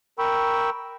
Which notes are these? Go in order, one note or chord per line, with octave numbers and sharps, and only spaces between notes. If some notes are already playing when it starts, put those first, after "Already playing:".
A#4 G5 B5 C#6 E6